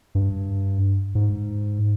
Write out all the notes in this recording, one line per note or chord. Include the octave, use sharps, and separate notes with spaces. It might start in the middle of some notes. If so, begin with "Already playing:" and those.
G2
G#2